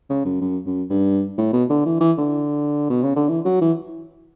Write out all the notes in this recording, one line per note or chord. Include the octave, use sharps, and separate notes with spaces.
C#3
F#2
F#2
F#2
G2
A2
B2
D3
E3
E3
D3
B2
C#3
D3
E3
F#3
E3